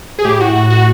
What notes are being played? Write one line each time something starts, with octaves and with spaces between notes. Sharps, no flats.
G#4
A2 G4
F#4
A2 F#4
F#4